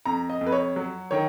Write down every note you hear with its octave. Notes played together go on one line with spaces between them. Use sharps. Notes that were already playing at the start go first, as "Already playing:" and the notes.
F2 A#5
D#5
F2
B4
C#5
F#3
D#3 C#5